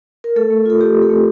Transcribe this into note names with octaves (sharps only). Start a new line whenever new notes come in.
A#4
A3 A4
A3
F4 A4
A3 G4
C4
A4
A3